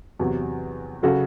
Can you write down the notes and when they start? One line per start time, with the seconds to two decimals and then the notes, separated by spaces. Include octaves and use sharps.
0.19 E2 C3 F#3
1.03 C#3 F#3 F#4 A4